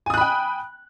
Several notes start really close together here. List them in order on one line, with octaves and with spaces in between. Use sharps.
G#5 D#6 F#6 B5 G5